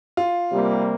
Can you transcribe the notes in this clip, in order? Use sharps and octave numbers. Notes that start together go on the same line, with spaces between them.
F4
C3 G3 A#3